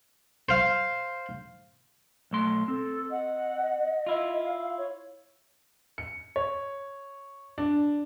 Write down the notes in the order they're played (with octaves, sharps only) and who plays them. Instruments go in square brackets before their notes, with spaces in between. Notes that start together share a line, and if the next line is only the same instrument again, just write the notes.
[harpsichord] C5 F5
[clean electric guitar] B1 A3 C6
[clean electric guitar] C4 [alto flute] A4
[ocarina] D#5 [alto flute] F#5
[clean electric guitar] E4 F4 [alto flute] F5
[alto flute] C#5
[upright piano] C#7
C#5
D4